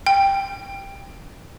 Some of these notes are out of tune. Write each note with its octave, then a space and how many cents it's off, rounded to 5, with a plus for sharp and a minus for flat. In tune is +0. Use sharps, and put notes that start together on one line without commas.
G5 +10